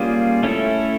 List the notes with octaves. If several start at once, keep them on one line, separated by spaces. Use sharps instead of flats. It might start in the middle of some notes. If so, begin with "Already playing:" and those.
Already playing: G3 A#3 C#4 F4 G#4
A3 C#4 E4 A4